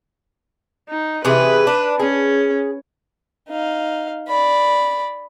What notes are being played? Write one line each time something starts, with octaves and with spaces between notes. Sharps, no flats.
D#4
C3 E3 G#4 B4
D4
C#4 G#4
D#4 F5
D5 B5